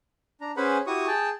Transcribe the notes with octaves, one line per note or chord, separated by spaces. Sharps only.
D4 A#5
C#4 G#4 B4 C5 F#5 B5
E4 F#4 G4 C#6 D#6
G#4 G5 A5